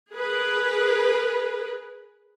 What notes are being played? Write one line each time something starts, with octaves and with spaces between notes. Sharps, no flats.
G#4 A#4 B4